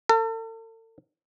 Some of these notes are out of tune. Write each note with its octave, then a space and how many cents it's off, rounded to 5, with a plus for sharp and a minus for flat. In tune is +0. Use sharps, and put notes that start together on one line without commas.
A4 +40